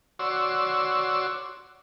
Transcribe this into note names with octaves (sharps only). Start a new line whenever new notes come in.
F#4 C#5 D5 C6 E6